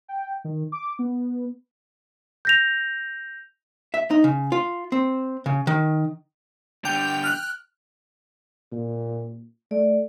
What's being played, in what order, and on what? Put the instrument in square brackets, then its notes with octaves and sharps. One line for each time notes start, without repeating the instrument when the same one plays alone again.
[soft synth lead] G5
D#3
D6
B3
[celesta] G6 A#6 F7
[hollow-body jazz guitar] E5
D#4
C#3
F4
C4
C#3
D#3
[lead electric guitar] D3 G3 [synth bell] G5 G6 F7
[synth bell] F6 F#6
[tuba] A#2
[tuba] A3 [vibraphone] D5